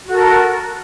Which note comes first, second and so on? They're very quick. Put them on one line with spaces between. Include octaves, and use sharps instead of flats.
F#4 A4 A#4